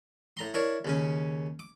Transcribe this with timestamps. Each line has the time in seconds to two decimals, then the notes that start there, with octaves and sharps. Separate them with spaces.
0.37 A2 A#5 C6
0.54 D4 E4 A#4 C#5
0.85 D#2 C#3 C#4
1.59 D6